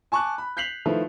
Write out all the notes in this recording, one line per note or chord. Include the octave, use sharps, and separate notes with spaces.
G#5 A5 C#6 D6 F#6
B5
G6 B6 C7 F7 F#7
D#3 F3 A3 E4 B4